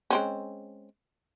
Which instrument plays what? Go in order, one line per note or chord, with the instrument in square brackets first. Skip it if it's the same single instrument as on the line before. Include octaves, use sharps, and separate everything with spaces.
[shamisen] G#3 C4 C#4